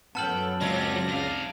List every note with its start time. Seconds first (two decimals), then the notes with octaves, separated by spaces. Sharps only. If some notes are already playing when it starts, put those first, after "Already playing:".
0.15 F#2 F#3 B3 A4 G5 A5 F6 F#7
0.61 C#2 C4 C#4 D5 A#6
1.08 C3 F5